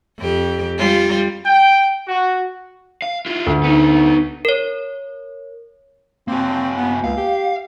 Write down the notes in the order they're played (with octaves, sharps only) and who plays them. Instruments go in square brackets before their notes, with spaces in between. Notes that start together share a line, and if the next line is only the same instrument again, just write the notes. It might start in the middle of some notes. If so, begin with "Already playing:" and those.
[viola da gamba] F2 G4
G3 F4
[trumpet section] G5
F#4
[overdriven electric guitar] F5
E4 F4
[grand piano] D2
[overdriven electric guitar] B3 D#4
[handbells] A#4 C#5
[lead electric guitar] A#3 F#4 [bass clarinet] C4
[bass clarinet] B3
[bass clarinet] C#2 [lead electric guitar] F5
[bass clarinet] G4